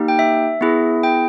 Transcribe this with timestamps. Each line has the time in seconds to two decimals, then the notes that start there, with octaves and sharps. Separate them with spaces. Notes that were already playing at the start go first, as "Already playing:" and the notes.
Already playing: A#3 D#4 G4
0.08 G5
0.19 E5
0.61 B3 E4 G#4
1.03 G5